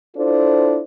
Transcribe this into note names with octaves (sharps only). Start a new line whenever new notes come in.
D4 E4 F4 A4 C5